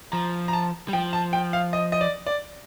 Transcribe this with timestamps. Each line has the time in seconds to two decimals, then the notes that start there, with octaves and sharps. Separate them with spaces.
0.12 F3 A#5
0.48 A#5
0.53 A5
0.88 G3
0.93 F3 G5
1.13 A5
1.33 G5
1.53 F5
1.73 D#5
1.92 D#5
2.01 D5
2.26 D5